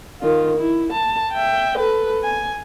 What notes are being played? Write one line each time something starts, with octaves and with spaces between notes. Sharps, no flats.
D#3 F4
E4
A5
E5 G5
A4 B4
G#5